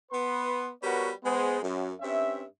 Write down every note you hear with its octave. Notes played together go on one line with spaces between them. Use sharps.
B3 B4 C6
G3 B3 F#4 A#4 B4 C#5
G#3 B3 C5
F#2
G2 C4 C#4 E5